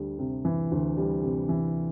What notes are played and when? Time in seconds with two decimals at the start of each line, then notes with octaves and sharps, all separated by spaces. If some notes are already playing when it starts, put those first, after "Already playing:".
Already playing: D2 G3
0.19 C3
0.45 E3
0.72 D2
0.97 G3
1.23 C3
1.49 E3